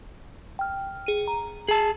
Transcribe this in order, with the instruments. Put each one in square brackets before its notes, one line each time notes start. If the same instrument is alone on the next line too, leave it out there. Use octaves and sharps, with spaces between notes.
[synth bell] G5 F6
G#4 D#7
A#5
[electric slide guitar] G#4 A5